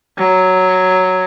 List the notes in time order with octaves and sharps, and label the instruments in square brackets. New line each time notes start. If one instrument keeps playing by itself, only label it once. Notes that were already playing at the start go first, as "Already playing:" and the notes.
[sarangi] F#3